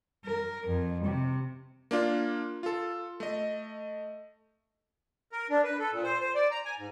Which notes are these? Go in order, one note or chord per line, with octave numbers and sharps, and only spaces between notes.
A#4
F2
C3
A#3 D4 F4
F4 A4
A3 D#5
A#4
D4
B4
A4
A#2
C5
C5
D5
A#5
G#5
G#2